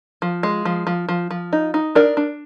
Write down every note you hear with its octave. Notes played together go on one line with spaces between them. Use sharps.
F3
G#3
F3
F3
F3
F3
D#4
D#4
D4 A#4 D5
D4